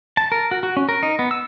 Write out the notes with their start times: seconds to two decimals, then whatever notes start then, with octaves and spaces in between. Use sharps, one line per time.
0.17 A5
0.32 A#4
0.51 F#4
0.63 F#4
0.77 C#4
0.89 A#4
1.03 D#4
1.19 B3
1.31 E6